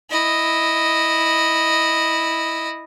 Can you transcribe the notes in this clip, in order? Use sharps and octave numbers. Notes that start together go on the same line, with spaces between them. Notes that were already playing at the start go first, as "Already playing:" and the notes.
E4 D#5